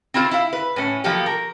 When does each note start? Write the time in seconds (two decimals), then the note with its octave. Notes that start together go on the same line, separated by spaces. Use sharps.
0.14 C4 E4 F4 A#4 C5
0.31 E4 F5
0.53 B4
0.76 A2 C#4
1.04 B2 F3 F#3 A#3 G4 A4
1.26 A#4